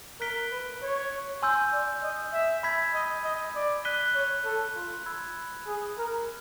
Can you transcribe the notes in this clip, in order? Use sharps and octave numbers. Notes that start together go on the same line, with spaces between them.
A#4 F#6 B6 D7 G7
B4
C#5
G#5 C6 E6 G6
D5
D#5
E5
B5 E6 G#6 B6
D#5
D#5
D5
F#6 B6 D#7 G7
C#5
A4
F4
B5 E6 G#6
G#4
A#4